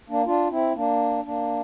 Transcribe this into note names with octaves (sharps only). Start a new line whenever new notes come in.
A#3 D4
D4 F4
C4 E4
A#3 D4
A#3 D4